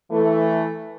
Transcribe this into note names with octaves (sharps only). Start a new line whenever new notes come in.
E3 A3